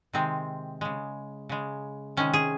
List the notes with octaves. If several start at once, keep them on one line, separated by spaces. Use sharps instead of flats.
C3 D#3 G#3 C4
C#3 G#3
C#3 G#3
C3 D#3 G#3 C#4
G#4